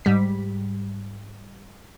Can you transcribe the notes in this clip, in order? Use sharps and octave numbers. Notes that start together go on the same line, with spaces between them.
G#2 G3 B6